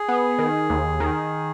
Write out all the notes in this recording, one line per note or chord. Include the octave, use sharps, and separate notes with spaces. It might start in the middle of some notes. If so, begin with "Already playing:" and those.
Already playing: G#4
B3
D#3
D#2
D#3